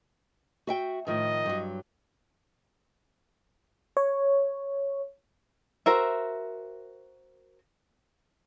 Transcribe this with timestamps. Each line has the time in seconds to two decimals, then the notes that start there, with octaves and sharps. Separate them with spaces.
0.67 F#4 E5 G5
1.07 A2 D#3 F3 D#5
1.46 G2 F#3
3.97 C#5
5.86 F#4 A#4 C5 E5